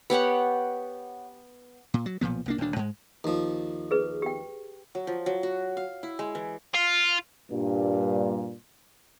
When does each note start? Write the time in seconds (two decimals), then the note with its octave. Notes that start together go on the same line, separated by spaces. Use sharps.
0.10 B3 G4 C#5 F#5
1.94 A#2
2.06 F#3
2.21 B1 A#2 F3 B3
2.46 C2 A#3 D4
2.58 D#1 D2 D4
2.76 G#2 G#3
3.24 D#2 F3
3.91 G#4 B4
4.22 G4 G5
4.95 F#3
5.07 F3
5.26 F#3
5.43 F#4
5.77 F5
6.03 E4
6.19 G#3
6.35 E3
6.75 F4
7.51 G2 A#2